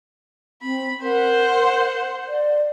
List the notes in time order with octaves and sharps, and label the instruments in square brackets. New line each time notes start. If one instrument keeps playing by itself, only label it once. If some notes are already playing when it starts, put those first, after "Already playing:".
[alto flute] C4 [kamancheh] B5
[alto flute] A#4 [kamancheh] C5 F#5
[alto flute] D5